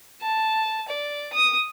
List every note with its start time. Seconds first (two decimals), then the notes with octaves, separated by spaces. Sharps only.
0.22 A5
0.88 D5
1.33 D#6